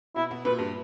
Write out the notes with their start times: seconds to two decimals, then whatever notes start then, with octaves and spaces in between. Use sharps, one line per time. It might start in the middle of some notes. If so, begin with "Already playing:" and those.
0.16 B2 E4
0.31 B2
0.45 A#2 B4
0.59 G2